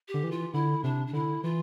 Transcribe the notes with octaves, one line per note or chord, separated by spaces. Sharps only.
G4
D3
E3
F4
D3 E4
C3 D4
D4
D3 E4
E3 F4